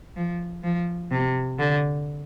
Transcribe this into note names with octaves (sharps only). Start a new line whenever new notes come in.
F3
F3
C3
D3